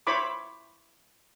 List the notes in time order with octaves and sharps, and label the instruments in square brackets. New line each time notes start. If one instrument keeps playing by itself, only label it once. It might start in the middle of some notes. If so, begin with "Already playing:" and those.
[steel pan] E4 C5 C#5 B5 D6